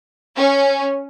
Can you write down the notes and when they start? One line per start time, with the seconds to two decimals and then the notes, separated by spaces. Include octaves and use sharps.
0.37 C#4